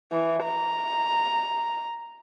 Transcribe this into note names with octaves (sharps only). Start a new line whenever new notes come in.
E3
A#5